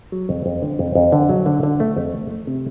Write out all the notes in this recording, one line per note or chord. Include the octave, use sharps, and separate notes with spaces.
F#3
F2
F2
D3
F2
F2
D3
F#3
D3
D3
A3
F2
A3
A3
C3